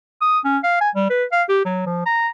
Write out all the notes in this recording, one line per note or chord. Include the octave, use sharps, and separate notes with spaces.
D#6
C#4
F5
G#5
G3
B4
F5
G4
F#3
F3
A#5